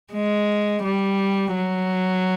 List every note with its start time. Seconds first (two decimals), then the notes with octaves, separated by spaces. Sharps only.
0.13 G#3
0.84 G3
1.55 F#3